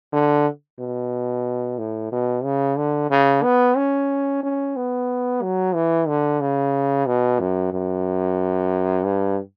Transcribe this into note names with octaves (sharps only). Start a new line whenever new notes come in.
D3
B2
A2
B2
C#3
D3
C#3
B3
C#4
C#4
B3
F#3
E3
D3
C#3
B2
F#2
F#2
G2